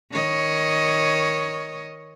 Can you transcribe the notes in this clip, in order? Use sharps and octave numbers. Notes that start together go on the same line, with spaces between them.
D#3 C#5 D#5